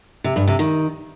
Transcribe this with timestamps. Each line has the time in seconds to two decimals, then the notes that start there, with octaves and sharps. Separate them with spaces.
0.24 C3
0.36 G2
0.47 C3
0.59 D#3